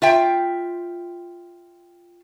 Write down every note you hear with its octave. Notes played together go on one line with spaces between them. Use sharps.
F4 E5 G5